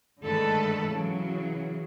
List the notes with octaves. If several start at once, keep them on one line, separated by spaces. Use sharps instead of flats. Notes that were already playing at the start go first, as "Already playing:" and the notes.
G#2 D3 D#3 A3 A4 B4
C#3 E3 F#3